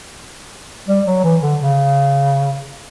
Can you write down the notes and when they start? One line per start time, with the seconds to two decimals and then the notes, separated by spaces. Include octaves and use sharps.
0.88 G3
1.07 F#3
1.24 E3
1.42 D3
1.61 C#3